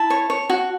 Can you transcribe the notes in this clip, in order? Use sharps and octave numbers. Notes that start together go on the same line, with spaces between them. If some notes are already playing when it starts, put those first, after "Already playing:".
Already playing: E4 A5
C#5
C#5
F#4